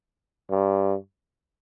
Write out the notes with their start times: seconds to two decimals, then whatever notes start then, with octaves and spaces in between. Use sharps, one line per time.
0.50 G2